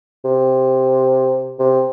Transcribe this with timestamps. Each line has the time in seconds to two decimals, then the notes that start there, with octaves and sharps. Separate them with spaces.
0.25 C3
1.59 C3